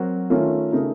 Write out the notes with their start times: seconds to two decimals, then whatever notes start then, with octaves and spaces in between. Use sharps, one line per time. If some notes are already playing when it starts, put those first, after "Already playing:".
Already playing: F#3 C4 F#4 A#4
0.30 D#3 A3 C#4 F4 A#4
0.72 C#3 A3 D#4 A#4